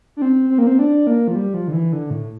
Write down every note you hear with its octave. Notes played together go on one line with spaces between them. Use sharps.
D4
C4
C4
A#3
C4
D4
A#3
F3
G3
F3
D3
E3
D3
A2